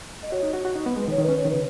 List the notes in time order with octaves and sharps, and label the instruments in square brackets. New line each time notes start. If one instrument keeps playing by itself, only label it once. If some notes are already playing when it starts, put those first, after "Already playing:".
[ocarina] D#5
[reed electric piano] F#4 [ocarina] C#5
[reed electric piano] D#4
F#4
F#4
D#4
B3
[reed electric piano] G#3 [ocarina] B4
[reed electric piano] D#3 [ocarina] C#5
[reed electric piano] D#3
[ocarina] B4
[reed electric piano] C#4
[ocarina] C#5
[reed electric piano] D#3
[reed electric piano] C#3 [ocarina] B4